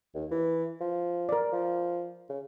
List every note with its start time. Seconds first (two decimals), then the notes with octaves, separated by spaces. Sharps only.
0.14 D#2
0.31 E3
0.81 F3
1.29 A#4 D5
1.52 F3
2.29 C#3